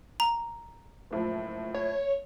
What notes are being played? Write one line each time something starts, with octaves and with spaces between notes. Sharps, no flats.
A#5
F#1 A2 F3
C#5